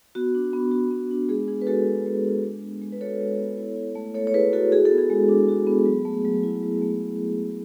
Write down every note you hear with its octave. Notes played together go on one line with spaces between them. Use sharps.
B3 F#4
D4
B3
F#4
B3
D4
G#3 G#4
D4 G#4
B4
G#3 F#4 A4
F#4
G#3
D4
G#3
B3
G#3
B4
F#4 A4 C#5
G#3
B3
E4
E4
A3
A3 A4 C#5
C#5
E4 G#4 B4
E4 F#4 A4
F#4 G#4
A4
B3
G#4
G#3
D4
F#4
B3
F#3
A3
F#3
E4
F#3
A3